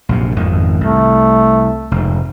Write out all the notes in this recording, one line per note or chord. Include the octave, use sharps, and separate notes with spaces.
A#1 F#2 C3
G#1 F2 D#3
C2 A3
F1 G#2